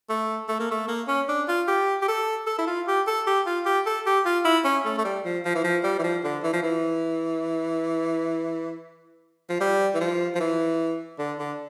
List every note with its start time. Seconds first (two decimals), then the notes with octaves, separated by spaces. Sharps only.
0.10 A3
0.49 A3
0.60 A#3
0.71 A3
0.88 A#3
1.08 C#4
1.29 D4
1.48 F4
1.68 G4
2.02 G4
2.08 A4
2.47 A4
2.59 E4
2.67 F4
2.88 G4
3.07 A4
3.27 G4
3.46 F4
3.66 G4
3.86 A4
4.06 G4
4.25 F4
4.45 E4
4.65 C#4
4.85 A3
4.98 A3
5.05 G3
5.25 F3
5.45 F3
5.55 E3
5.64 F3
5.84 G3
5.99 E3
6.04 F3
6.24 D3
6.43 E3
6.53 F3
6.63 E3
9.49 F3
9.60 G3
9.95 E3
10.00 F3
10.35 F3
10.40 E3
11.19 D3
11.39 D3